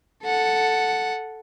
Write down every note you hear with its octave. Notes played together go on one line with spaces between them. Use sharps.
A4 F#5